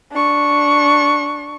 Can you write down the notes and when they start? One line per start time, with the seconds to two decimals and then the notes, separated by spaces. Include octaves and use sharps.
0.12 D4 C#6